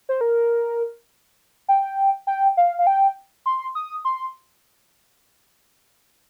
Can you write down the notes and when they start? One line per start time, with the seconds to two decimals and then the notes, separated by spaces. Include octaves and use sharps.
0.09 C5
0.21 A#4
1.68 G5
2.27 G5
2.57 F5
2.79 F5
2.87 G5
3.46 C6
3.75 D#6
4.05 C6